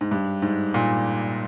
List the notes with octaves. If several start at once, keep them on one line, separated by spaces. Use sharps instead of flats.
G#2
G2
G#2
A#2